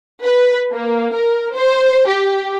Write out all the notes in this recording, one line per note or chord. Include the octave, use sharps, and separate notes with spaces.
B4
A#3
A#4
C5
G4